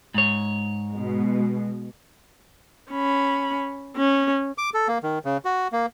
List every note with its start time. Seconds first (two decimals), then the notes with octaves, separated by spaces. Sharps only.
0.14 G#2 C#5
0.92 B2 G#3
2.91 C#4 B5
3.96 C#4
4.58 D6
4.74 A4
4.88 A#3
5.03 D#3
5.25 C#3
5.45 F#4
5.72 A#3